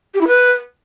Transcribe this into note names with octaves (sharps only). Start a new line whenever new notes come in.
G4
E4
B4